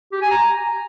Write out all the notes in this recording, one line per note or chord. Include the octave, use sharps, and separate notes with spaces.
G4
G#5
A#5